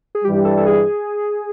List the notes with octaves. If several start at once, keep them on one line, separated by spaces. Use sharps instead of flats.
G#4
G2 E3 G3 G4
A4
A4
G#4